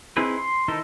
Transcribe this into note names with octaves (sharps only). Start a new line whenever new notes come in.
C4 D#4 E4 G#4 B4
C6
D#3 D#4 E4 A4 C5